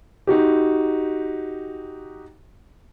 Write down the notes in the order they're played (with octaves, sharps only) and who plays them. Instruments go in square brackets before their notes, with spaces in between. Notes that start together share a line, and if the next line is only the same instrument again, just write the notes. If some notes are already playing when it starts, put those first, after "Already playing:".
[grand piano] D#4 F#4 G4